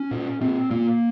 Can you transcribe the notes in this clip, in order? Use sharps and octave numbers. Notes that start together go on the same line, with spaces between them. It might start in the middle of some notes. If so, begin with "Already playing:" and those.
Already playing: C#4
A#2
A#2 C4
A#2 A#3